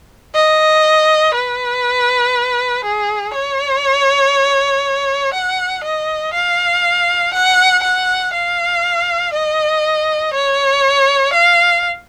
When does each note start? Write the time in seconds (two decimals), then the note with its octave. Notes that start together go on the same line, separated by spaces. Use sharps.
0.35 D#5
1.34 B4
2.84 G#4
3.34 C#5
5.34 F#5
5.84 D#5
6.34 F5
7.34 F#5
7.83 F#5
8.33 F5
9.33 D#5
10.34 C#5
11.33 F5